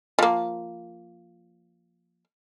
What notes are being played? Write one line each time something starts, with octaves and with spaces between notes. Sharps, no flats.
F3 A#3